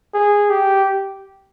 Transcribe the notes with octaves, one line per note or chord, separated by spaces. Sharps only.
G#4
G4